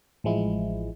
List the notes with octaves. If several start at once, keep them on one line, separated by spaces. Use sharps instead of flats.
A1 F3 G#3 E4